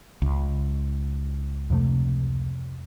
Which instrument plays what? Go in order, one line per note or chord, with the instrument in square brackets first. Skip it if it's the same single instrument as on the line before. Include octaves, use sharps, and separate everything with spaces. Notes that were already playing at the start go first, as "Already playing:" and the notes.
[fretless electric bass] C#2
[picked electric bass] F2 C3 A3